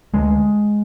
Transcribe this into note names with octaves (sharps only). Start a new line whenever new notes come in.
D2 G#3